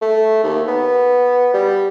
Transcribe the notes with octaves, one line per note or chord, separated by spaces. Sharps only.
A3
D#2
B3
G3